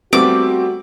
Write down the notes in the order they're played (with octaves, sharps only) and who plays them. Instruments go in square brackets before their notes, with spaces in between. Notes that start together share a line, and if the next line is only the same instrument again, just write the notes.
[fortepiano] G3 A3 B3 [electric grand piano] C4 [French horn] F#4 [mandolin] D6